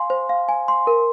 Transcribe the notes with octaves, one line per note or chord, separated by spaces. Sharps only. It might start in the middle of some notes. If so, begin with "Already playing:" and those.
Already playing: F5 G#5 C6
C5
F5
G#5
C6
A#4